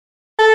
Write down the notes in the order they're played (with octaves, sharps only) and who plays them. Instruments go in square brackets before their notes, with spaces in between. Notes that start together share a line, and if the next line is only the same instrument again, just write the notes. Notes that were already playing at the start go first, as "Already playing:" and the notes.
[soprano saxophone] A4